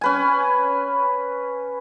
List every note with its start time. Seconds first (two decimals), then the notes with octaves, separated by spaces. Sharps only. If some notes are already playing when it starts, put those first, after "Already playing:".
0.01 C#4 B4 G#5